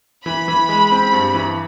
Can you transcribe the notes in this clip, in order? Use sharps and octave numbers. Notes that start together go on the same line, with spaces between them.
E3 B5
E3
G#3
C4
G2
E3